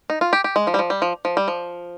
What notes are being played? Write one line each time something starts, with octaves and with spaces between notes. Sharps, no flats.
D#4
F4
G4
G4
G#3
F3
G3
F3
G3
F3
F3
G3
F3